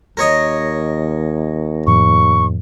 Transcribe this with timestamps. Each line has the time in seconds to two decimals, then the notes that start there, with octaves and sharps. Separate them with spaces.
0.17 D#2 A#4 C#5 D#5
1.87 F2 A2 F3 C#6